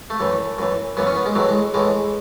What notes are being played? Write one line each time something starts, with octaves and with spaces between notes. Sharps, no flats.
A3
F#2 E3
F#2 E3
F#2 E3 B3
C#4
B3
G#3
A2 E3 F#3
G#3
A2 E3 G#3